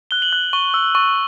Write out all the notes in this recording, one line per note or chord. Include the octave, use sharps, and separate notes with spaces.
F#6 G7
F#7
F#6
C#6 G7
E6
C#6